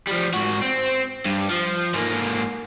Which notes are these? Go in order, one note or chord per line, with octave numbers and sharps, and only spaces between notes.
F3 G3
G#2 F#4
C4
G2
F3
G#2 A#3